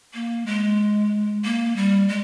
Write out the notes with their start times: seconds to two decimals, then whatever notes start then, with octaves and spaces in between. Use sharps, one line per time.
0.14 A#3
0.46 G#3
1.45 A#3
1.77 G3
2.08 G#3